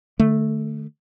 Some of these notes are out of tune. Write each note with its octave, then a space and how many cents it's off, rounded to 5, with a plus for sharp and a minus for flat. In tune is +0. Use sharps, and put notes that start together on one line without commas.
D3 +35 A3 -5